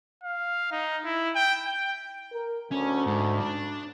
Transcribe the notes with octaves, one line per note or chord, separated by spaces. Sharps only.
F5
D#4
E4
G5
G5
A#4
D2 C#4
G#2
D4